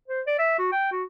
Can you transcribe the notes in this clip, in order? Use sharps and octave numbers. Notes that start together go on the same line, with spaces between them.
C5
D5
E5
F#4
G5
F#4